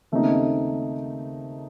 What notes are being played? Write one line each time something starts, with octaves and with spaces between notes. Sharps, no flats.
D#2 C#3 A3 C4 D#4